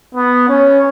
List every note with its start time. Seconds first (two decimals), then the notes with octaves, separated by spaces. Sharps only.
0.15 B3
0.49 C#4